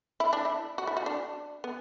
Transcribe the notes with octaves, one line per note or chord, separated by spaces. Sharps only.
E4
D4
E4
F#4
E4
F#4
D4
B3